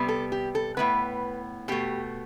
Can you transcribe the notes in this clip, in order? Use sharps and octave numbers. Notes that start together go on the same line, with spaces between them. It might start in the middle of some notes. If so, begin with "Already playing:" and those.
Already playing: C3 G3 B3
A4
G4
A4
A2 E3 B3 B4
B2 A3 G4